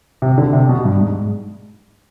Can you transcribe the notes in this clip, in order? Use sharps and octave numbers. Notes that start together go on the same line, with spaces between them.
C3
D3
C3
B2
G2
G#2